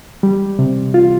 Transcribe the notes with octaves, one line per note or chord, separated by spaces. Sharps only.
G3
C3
F4